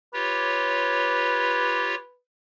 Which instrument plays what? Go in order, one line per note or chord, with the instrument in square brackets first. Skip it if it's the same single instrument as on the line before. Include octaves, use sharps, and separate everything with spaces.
[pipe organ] F4 G4 C#5 [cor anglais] B4